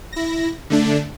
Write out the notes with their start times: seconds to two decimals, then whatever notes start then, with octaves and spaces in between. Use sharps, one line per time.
0.12 E4 A#6
0.70 D3 A3 D4